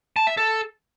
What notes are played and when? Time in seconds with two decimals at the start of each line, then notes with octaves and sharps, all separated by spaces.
0.16 A5
0.27 E5
0.37 A4